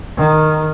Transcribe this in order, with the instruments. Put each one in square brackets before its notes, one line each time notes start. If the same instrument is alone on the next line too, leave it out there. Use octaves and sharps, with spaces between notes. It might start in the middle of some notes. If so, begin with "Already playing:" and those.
[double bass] D#3